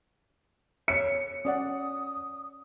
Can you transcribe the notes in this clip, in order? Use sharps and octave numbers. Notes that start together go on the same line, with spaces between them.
C#5 E5 C#7
C#4 D5 F#5 D#6